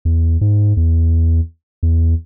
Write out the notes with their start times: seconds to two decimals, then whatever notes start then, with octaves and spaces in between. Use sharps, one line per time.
0.05 E2
0.41 G#2
0.77 E2
1.83 E2